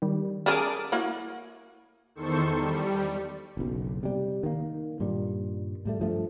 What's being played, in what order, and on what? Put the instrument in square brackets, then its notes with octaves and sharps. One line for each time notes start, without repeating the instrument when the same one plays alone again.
[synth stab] D#3 G3
[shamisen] C#4 G#4 A#4 [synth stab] A5 D6 D#6
[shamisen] A#3 E4 F#4
[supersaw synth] E2 D#3 A4 C5 C#6 C#7
G3
[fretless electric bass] F#1 B1
C3 G3
D#3 A#3
G2 A#2 D#3 G3
A2 G3 A3
G2 F3 A3